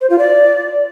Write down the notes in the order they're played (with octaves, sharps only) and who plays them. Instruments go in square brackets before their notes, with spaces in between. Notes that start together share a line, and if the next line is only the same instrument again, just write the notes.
[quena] C5
F4
D5